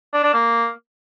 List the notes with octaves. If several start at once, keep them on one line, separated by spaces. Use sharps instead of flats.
D4
D4
A#3